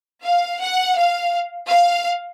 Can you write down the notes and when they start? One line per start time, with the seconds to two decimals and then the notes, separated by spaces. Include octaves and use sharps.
0.24 F5
0.61 F#5
0.97 F5
1.70 F5